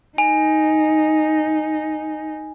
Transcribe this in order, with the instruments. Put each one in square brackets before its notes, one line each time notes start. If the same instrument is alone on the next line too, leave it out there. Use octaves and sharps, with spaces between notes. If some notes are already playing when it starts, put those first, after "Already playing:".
[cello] D#4 [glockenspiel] G#5